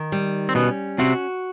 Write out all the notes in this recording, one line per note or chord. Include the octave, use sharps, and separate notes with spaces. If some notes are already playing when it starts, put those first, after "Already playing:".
Already playing: D#3
G3
C4
B2 B3 C#4
C3 C4 F#4